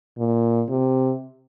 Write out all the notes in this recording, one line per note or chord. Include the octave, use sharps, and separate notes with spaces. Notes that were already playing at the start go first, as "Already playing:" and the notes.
A#2
C3